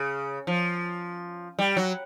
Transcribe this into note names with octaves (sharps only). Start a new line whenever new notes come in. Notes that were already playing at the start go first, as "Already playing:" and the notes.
Already playing: C#3
F3
G3
F#3